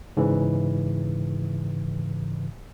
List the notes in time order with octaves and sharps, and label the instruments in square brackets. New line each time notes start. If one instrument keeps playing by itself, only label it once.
[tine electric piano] G#2 C#3 E3